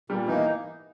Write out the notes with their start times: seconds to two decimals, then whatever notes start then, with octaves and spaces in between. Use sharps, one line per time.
0.10 A#2 G3
0.27 E3 A#3 D#4